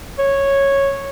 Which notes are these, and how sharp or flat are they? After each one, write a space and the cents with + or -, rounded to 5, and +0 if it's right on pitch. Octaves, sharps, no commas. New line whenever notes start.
C#5 -10